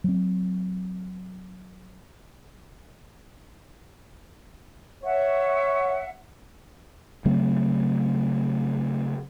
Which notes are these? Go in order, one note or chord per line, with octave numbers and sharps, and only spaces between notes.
F#3 C4
C#5 E5 F#5
C#3 F#3 A3 C4